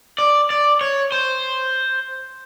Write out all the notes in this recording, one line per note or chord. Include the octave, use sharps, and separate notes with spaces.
D5
D5
C#5
C5